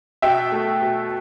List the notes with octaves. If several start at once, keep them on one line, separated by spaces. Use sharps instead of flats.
B2 E5 G5
A3
B2